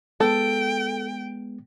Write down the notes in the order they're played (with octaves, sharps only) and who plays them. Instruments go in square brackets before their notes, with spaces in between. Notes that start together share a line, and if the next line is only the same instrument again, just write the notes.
[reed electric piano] G#3 B3 [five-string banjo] A4 [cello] G5